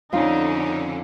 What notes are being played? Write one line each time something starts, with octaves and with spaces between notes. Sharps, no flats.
F2 D3 C#4 D#4 F4